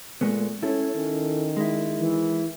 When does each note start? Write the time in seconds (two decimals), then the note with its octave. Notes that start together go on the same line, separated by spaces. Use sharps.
0.21 A#2 G#3 A3 B3
0.63 C#4 E4 A4 C#5
0.96 D#3 C#4
1.57 G#3 E4
1.99 E3